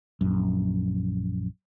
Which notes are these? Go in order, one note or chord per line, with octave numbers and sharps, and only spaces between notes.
A#1 F#2